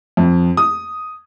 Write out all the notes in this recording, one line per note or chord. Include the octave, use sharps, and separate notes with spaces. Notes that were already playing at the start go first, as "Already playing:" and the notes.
F2
D#6